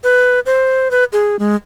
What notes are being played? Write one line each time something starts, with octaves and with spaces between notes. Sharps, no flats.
B4
C5
B4
G#4
G#3